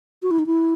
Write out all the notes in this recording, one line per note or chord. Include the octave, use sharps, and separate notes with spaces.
F#4
E4
D#4
E4